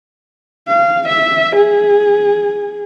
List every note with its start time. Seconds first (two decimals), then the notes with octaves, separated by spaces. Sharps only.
0.68 F5
1.09 E5
1.56 G#4